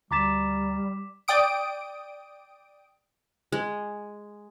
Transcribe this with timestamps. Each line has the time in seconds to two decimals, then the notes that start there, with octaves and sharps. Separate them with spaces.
0.11 D2 G3 A#5 D6 A6 B6 E7
1.28 D5 G5 D#6 D7
3.52 G#3